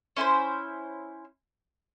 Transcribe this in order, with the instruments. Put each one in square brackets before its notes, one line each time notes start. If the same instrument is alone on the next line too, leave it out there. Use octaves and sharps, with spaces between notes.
[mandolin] C#4 E4 B4 C5